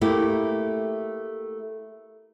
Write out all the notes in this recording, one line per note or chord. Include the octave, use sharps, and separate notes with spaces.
A3 A#3 E4 G4